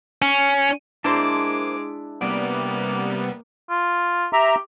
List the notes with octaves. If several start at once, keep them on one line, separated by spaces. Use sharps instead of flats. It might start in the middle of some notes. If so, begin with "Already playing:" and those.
C#4
G#3 A#3 D4 E4 C5 A5 C6 D6
C3 G3 A#3 B3 D5
F4
G4 E5 A#5